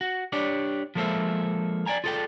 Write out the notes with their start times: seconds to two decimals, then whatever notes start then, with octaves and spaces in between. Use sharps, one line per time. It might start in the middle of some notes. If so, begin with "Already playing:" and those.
0.01 F#4
0.32 D4 G4 C#5 D5
0.95 F3 G#3 A#3 A4 C5 E5
1.86 D5 G5 G#5 A#5
2.04 F4 G#4 A4 C#5 D5 G5